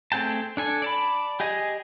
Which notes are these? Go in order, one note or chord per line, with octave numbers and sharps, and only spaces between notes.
A3 C4 G#4 G5 A5
D4 A4 G#5
D5 A5 B5
G4 G#4 D#5 G#5